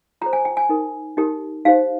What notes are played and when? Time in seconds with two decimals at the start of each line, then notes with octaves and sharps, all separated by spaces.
0.21 F4 G#4 C5 A#5
0.33 G#5
0.45 G5
0.57 G#5
0.69 D#4 A#4
1.17 D#4 G4 A#4
1.65 D#4 G4 C5 F5